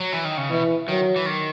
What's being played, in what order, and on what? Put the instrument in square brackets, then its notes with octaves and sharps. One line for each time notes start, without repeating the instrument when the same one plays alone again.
[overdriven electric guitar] F#3
E3
D#3
C#3
[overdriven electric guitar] B2 [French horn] E3
[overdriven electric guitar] D#3 [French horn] F#3
[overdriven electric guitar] E3
D#3